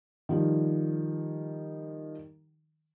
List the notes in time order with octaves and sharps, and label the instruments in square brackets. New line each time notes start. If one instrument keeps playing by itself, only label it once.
[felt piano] D#3 F3 G3